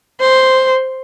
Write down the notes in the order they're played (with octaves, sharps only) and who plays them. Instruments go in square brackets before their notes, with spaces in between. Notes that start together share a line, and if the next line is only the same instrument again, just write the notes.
[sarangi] C5